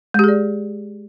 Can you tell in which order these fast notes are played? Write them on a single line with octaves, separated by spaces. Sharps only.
G#3 G4 G#4 D5